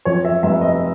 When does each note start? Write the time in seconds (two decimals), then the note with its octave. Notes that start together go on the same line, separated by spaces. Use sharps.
0.05 F2 C#5
0.25 E5
0.43 F1 E5
0.61 D#5